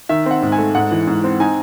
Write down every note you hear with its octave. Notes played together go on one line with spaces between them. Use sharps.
D#3 E5
C4 F#5
G#2
G#5
A3
G#2 F#5
E3
G#2
C4
D#4 G#5